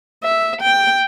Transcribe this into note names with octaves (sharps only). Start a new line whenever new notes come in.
E5
G5